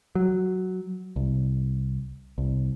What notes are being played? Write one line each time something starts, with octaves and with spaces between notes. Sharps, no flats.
F#3
C2
C2